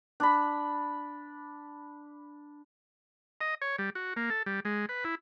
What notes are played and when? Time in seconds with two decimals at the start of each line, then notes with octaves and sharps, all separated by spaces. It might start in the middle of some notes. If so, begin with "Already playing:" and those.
0.20 D4 B5
3.41 D#5
3.62 C#5
3.78 G3
3.95 F#4
4.17 A#3
4.30 A4
4.46 G3
4.65 G#3
4.89 B4
5.05 E4